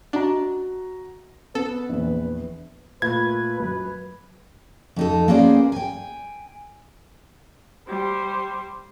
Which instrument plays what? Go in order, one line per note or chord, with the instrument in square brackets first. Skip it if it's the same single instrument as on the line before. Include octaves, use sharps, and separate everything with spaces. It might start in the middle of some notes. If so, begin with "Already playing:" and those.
[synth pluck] D4 [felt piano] F#4 D#5 A#5
[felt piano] B3 [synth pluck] A4 [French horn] B4
[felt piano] A#1 E2
[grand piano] A#2 A3 F4 [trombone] B4 [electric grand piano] G#6
[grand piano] F#2 [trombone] B4
[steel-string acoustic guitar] F2 D#4 A4
A#3 B3 C#4 G#4 C5 D5
G5 G#5
[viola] G3 C5